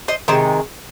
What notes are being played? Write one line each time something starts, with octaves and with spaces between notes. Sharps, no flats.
C5 D#5
C3 D#3 G#3 C5